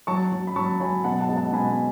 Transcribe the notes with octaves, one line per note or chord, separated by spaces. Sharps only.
F#3 A5 C#6
F#3
B5
F#3 A5 C#6
F#3 G#5 B5
B2 F#5 A5
F#5 A5
G#3
F#5 A5
B2 G#5 B5
G#5 B5